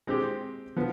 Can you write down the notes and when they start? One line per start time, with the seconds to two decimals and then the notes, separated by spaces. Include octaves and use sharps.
0.07 G#3 C4 G4
0.76 F3 B3